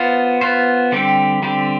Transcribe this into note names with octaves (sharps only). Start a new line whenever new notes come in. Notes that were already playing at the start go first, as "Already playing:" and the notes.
Already playing: B3 F4 C5
B3 F4 C5
D3 G3 C4 G4
D3 G3 C4 G4